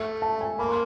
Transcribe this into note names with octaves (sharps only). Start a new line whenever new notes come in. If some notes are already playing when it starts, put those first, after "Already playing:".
Already playing: A3 E5
A5
G#5
A#3 B5
C6